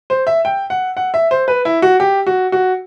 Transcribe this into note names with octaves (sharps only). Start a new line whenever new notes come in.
C5
E5
G5
F#5
F#5
E5
C5
B4
E4
F#4
G4
F#4
F#4